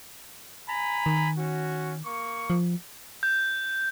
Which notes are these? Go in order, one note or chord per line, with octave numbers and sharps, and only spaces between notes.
G#5 A#5 B5
D#3
C#4 F#4
A#3 C#6
F3
G6